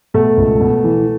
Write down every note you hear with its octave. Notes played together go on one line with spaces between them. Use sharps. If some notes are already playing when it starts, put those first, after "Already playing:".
B2 A3
C#2
B2
E3